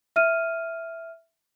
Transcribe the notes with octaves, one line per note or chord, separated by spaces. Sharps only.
E5 F6 D#7